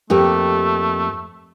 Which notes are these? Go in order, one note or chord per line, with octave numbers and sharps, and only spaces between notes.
F2 A3 A#3 G4